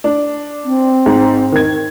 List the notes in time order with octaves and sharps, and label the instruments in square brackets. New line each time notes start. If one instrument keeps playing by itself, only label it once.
[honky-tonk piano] D4
[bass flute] C4
[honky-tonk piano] G#2
D#3 G#6